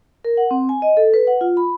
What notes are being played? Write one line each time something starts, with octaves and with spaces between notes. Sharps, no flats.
A#4
F#5
C4
G#5
D#5
A4
B4
F#5
F4
B5